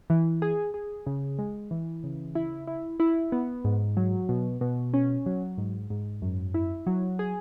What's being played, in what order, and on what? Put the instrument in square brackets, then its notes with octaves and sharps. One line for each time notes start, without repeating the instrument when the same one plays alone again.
[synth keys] E3
G#4
G#4
C#3
G#3
E3
C#3
E4
E4
E4
B3
G#2
F#3
B2
B2
C#4
F#3
G#2
G#2
F#2
E4
F#3
G#4